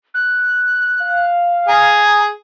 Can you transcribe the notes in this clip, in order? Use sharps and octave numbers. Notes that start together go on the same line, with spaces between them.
F#6
F5
G#4 A#5